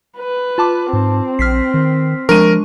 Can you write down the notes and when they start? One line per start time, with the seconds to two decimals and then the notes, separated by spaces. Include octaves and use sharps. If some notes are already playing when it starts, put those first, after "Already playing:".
0.18 B4
0.58 F4 A5 D6
0.93 G#2 C4
1.39 A#1 F6 B6 C7
1.74 D#3
2.29 F3 G#3 D4 A#4 C#6 D#7